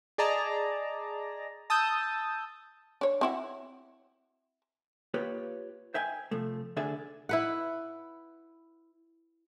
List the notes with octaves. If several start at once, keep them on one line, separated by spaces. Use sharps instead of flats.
G#4 D5 D#5 A5 A#5
A5 D#6 E6 G6
D4 C#5
C4 E4 F#4
A#3 F4 G4 B4 C#5
C5 E5 G5 G#5
C3 F3 A3
D2 D3 G#4 D5 E5 G#5
E4 B4 F#5